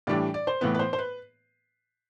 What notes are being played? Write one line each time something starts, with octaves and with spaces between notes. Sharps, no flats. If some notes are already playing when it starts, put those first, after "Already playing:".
A2 E3 G3 D4 D5
D5
C5
A2 E3 B3 B4
B4
C5
C5
B4